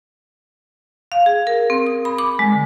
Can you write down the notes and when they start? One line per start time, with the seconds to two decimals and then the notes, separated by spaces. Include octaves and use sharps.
1.12 F5
1.26 G#4
1.47 A#4
1.70 C4
1.86 D#6
2.05 B5
2.18 D6
2.39 G#3
2.52 D3